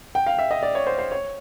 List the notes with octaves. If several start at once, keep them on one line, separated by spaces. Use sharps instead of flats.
G5
F5
E5
D#5
D5
C#5
C5
C5
C#5